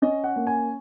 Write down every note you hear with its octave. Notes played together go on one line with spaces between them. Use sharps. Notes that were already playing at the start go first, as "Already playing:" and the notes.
C#4 D#5
F#5
A#3
G#5